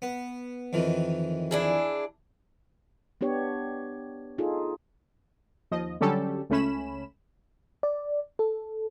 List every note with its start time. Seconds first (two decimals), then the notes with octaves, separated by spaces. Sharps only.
0.02 B3
0.73 F2 D#3 E3
1.51 D4 E4 G#4
3.21 B3 D4 G4 C#5
4.38 D#4 F4 G#4 A4
5.71 D#2 F3 D#5
6.01 D3 F#3 G3 C#4 G4 A4
6.50 C#2 A3 C#4 B5 E7
7.83 D5
8.39 A4